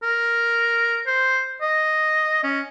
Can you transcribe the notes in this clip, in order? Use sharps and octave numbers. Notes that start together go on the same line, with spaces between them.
A#4
C5
D#5
C#4